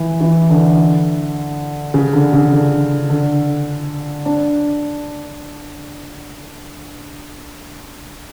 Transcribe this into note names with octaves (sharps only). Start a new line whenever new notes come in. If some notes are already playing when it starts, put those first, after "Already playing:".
Already playing: E3
E3
D3
C#3
D3
C#3
D3
D3
D4